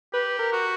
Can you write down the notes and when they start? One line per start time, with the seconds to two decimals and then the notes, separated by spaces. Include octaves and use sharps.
0.13 G4 B4
0.39 A#4
0.53 F#4